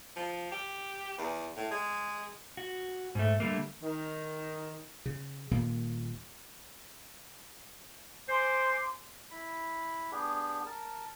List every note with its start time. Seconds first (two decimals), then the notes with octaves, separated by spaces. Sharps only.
0.16 F3
0.52 G4
1.18 E2
1.56 A2
1.71 G#3
2.57 F#4
3.15 G#2 A3
3.40 D3 G3 A3 A#3
3.81 D#3
5.06 C#3
5.51 D#1 A#2 D#3 A#3
8.28 C5 G#5 C6 D6
9.31 E4 B5
10.11 B3 D4 G4 G#4
10.66 A#4 A5